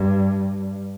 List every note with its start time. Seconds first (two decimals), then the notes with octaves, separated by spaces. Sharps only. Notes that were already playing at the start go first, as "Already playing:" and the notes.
Already playing: G2